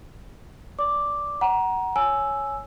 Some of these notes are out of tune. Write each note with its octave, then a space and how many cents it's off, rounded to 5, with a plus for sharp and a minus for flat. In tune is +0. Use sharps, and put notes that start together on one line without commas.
D5 -15 D6 +0
F#5 +20 A#5 +20
C#5 +0 G#5 +15 E6 +0